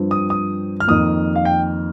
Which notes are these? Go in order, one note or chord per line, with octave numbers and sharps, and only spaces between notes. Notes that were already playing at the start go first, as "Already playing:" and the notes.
Already playing: G2 F3 C4
D#6
D#6
F6
F2 D#3 A#3 D#6
F5
G5